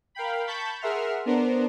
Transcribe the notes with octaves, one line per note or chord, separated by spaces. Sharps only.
A#4 F5 G5 B5
A5 B5 C#6 G6 A6 B6
G#4 A#4 E5 F#5 C6 F6
B3 D4 A#4 C5